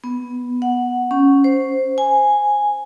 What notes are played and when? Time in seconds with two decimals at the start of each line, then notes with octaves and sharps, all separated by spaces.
0.04 B3
0.62 F#5
1.11 C#4
1.44 C5
1.98 G#5